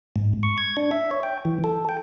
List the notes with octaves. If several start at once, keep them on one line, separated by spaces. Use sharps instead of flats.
G#2
C#6
G#6
D4
E5
C#5
G5
E3
A4
G5